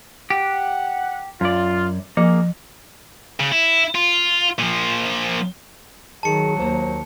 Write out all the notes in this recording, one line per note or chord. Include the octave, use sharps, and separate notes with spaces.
G4 F#5
F#2 F4 D5
F3 A#3 G#4
C#3
E4
F4
A#2 F3
D#3 F#3 G#4 A5 C#7
D#2 A#3 C5